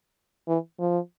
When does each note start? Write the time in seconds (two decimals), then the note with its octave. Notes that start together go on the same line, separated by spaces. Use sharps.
0.48 E3
0.79 F3